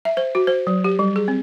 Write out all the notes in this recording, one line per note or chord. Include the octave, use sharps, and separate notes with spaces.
E5
C5
F#4
C5
F#3
G4
G3
G#4
C4